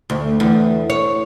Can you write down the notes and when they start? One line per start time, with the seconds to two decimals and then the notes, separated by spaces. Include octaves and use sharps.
0.10 D2
0.40 E2
0.90 C#5